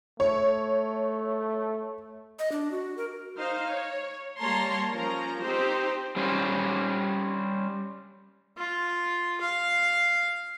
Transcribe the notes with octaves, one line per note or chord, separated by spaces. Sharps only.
A3 C#5
D#5
D4
F#4
A#4
D#4 C5 F5
C#5
G3 A#3 C#5 A5 A#5 C6
F3 C#4 A#4 A#5
C4 D#4 G4 C5
G3 C#4 C5
F4
F5